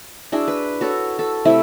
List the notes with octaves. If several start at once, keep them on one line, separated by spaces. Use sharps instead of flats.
D4 E4 F#4 G#4
B4
F#4 A4 C#5
A4
C3 A3 E4